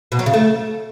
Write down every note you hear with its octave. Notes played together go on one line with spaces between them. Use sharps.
B2
F#3
C#3
A3